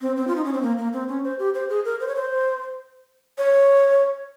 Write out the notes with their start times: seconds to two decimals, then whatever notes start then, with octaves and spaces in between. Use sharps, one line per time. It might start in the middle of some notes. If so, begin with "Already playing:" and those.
0.01 C4
0.17 C4
0.27 F4
0.36 D#4
0.44 C#4
0.53 C4
0.62 A#3
0.78 A#3
0.93 C4
1.08 C#4
1.24 C5
1.39 G4
1.54 C5
1.69 G#4
1.85 A#4
2.00 C5
2.08 C#5
2.16 C5
3.38 C#5